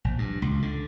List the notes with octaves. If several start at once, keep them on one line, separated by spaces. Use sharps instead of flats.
A#1
G2
C#2
D3